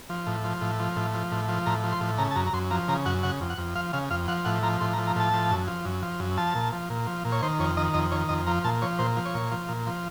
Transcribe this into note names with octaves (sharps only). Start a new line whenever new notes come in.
F3
A2
F3
A2
F3
A2
F3
A2
F3
A2 A#5
F3
C6
A2
C#3 A#5
A5
F#2 A#5
A#5
F#2 C6
F3 A#5
C#3 A#5
F#2 F#5
C#3 F#5
F2
F#5
F2
F3 F5
C#3 F5
F2 F5
F3 F#5
A2 F#5
F3 A#5
A2 C6
A#5
F3
A#5
A2 A5
F3
F#2
F3
F#2
F3
F#2
F3 A5
A#2
F3
A#2
F3
A#2
C#5
D#3 C5
F2 C#5
D#3 D#5
F2 D#5
D#3 C#5
F2 D#5
F3 A#5
A#2 A5
F3 C#5
A#2 C5
F3
C#5
A#2
F3
A#2
F3